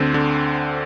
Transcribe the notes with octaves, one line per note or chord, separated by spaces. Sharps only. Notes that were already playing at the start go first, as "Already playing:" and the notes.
Already playing: D2 D3 C4
D3